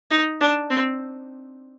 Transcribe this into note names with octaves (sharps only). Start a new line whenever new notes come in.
D#4
D4
C4